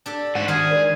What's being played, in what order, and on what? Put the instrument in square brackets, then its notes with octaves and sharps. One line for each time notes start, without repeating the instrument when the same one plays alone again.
[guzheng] D4 G4 A4
[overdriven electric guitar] G#2 F#4 [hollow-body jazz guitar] F#5
[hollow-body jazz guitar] D#3 [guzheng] G3 F#4 C5 [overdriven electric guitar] G#4 [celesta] F6
[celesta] A#4 D5